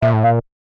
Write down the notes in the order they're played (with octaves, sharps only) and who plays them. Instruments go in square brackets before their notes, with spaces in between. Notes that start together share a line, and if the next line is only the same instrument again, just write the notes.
[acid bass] A#2 [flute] E5
[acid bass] A2
[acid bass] A#2 [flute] F5